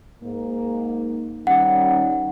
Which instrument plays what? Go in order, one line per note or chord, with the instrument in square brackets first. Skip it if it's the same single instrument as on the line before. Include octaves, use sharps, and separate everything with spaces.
[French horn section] G#2 A#3
[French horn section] D#3 G3 C#4 [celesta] F#5